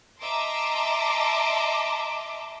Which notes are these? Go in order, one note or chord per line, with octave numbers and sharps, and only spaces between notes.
D#5 E5 A5 A#5 C6 D6